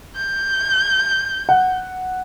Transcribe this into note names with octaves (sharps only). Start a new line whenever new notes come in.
G6
F#5